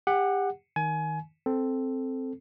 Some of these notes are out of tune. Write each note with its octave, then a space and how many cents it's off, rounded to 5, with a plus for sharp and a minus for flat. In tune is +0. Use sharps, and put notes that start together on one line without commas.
G4 +30 F#5 +0
D#3 +10 G#5 +25
C4 +0 A4 +0